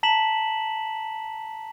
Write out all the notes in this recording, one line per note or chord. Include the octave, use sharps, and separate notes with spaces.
A5 A#5 B6 E7 F#7